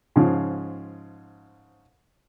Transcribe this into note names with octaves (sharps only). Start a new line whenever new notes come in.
G#2 C#3 F3